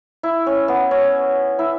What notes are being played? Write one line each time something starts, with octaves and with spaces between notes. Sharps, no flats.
E4
C#4
B3
C#4
E4